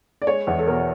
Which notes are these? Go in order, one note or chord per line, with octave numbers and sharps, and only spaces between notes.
D5
G#3 C#5
E2
A4
B2 A#4